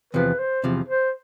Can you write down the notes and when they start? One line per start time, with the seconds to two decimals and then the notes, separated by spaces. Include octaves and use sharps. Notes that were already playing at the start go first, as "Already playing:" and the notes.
0.13 E2 C3 F3 B4
0.39 C5
0.64 E2 C3 F3
0.88 C5